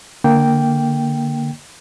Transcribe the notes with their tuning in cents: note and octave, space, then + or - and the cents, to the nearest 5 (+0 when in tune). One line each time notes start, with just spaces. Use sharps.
D3 +0 A#3 +0 G5 +0